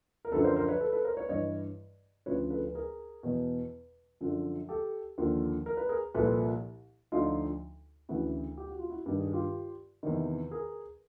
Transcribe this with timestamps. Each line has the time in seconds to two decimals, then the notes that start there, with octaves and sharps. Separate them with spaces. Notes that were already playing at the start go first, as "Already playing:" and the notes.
0.25 A#4
0.32 F#2 D3 F3 A4 B4
0.44 A#4 C5
0.56 A#4 C5
0.68 B4 C#5
0.80 A4 B4
0.93 A4 B4
1.05 A#4 C5
1.17 B4 C#5
1.29 G2 E3 C#5 D#5
2.26 D2 C#3 F3 B4 C#5
2.50 A4 B4
2.65 B4
2.75 G#4 A#4
3.23 E2 B2
4.21 F#2 D3 F3
4.69 G4 A4
5.18 D#2 D3 F3
5.66 A#4
5.77 B4
5.89 G#4 A#4
6.14 C2 A#2 F3 A4 B4
7.12 D2 D3 F3 D#4 F4
8.09 D2 C#3 E3 E4 F#4
8.58 G4
8.68 F#4
8.79 F4
8.90 E4 F#4
9.06 G2 D#3 G4
9.20 G#4
9.33 F4 G4
10.03 E2 C3 D#3
10.51 G#4 A#4